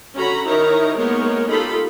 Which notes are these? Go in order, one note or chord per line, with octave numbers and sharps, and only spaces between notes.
D3 C#4 F#4 A#5 B5
D#3 D#4 E4 A#4 C#5 A#5
G#3 A#3 B3 D#4 A#4 C#5
D#4 F4 G4 A4 B5